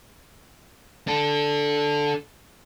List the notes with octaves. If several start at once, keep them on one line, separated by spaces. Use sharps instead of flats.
D4 A4